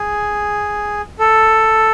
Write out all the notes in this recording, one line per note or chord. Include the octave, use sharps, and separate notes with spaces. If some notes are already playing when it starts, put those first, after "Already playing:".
Already playing: G#4
A4